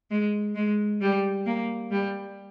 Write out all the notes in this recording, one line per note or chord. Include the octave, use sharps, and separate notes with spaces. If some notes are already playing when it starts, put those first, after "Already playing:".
G#3
G#3
G3
A#3
G3